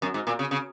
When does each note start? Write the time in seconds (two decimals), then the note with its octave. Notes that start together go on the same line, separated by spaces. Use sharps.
0.02 F#2
0.14 G#2
0.27 A#2
0.39 C#3
0.51 C#3